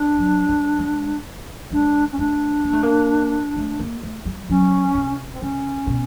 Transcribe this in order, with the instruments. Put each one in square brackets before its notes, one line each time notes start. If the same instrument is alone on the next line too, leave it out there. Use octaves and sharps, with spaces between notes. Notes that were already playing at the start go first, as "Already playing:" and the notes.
Already playing: [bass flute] D4
[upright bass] F#3
G3
G#3
[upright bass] G#3 [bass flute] D4
[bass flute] C#4
[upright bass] A3 [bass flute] D4
[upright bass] A#3
A3
A#3
A3
A#3
A3
G3
[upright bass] F#3 [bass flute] C#4
[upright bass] C3
[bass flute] C4
[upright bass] C#3 [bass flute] C#4
[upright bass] B2